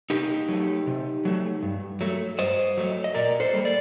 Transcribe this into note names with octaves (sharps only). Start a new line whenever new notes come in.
C3 D#4 G4
F#3 A3
C3
F#3 A3
G2
F#3 A3
G2 C5 D#5
F#3 A3
D#5
A#2 A#4 D5
A4 C5
G3 A#3
D5